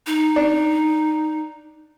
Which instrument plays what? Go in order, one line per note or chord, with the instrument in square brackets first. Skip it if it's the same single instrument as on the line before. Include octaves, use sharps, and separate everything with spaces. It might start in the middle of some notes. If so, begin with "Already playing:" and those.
[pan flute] D#4
[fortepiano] D4